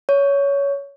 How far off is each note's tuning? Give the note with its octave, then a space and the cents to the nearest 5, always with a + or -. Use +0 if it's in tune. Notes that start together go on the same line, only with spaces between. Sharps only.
C#5 +15